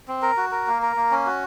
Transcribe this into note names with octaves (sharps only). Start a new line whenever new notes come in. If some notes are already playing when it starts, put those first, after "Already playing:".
C4
A#4
F#4
A#4
A#3
A#4
A#3
C#4
F#4